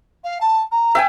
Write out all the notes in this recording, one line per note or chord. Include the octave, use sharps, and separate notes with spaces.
F5
A5
A#5
E5 G5 G#5